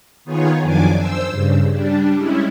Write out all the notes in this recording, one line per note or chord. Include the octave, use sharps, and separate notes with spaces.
D#3 B3 D#4 F4 G#4 C#5
F#2 D#3 F3 D4 G#5 D6
C5 E6
G2 C#3
G3 D4
G3 G#3 C#4 E4